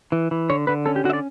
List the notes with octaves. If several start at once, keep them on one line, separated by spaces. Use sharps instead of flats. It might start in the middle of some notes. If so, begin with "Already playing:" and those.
E3
E3
D3 C#5
D3 B4
C#4 A4
G4
D3 F#4
E5
D5